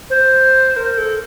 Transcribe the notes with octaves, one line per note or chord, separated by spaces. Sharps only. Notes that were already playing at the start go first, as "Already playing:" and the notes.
C5
A#4
A4